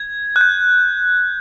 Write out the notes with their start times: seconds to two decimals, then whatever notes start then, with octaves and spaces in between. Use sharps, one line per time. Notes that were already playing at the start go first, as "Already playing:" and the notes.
Already playing: G#6
0.36 F#6
0.41 G6